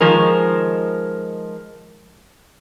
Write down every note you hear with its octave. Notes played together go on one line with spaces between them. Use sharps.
D#3 F3 G#3 A#4